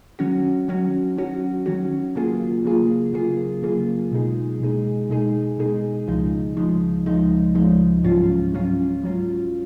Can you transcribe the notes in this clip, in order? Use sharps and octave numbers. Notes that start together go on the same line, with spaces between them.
D#3 F#3 C#4 F#4
D#3 F#3 C#4 F#4
D#3 F#3 C#4 F#4
D#3 F#3 C#4 F#4
C#3 F#3 A#3 F4 G#4
C#3 F#3 A#3 F4 G#4
C#3 F#3 A#3 F4 G#4
C#3 F#3 A#3 F4 G#4
B2 G#3 D#4 G#4
B2 G#3 D#4 G#4
B2 G#3 D#4 G#4
B2 G#3 D#4 G#4
C#2 C#3 F3 G#3 D#4
C#2 C#3 F3 G#3 D#4
C#2 C#3 F3 G#3 D#4
C#2 C#3 F3 G#3 D#4
G#2 F#3 C#4 F4
G#2 F#3 C#4 F4
G#2 F#3 C#4 F4